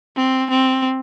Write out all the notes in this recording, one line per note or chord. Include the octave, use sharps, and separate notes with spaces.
C4
C4